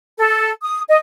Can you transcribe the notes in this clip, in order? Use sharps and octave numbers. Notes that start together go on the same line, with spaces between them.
A4
D#6
D#5